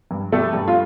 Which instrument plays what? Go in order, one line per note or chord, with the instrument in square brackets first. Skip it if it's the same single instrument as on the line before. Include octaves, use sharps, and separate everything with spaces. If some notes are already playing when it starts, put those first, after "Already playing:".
[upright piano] G2
G3 A3 A4
G2
F4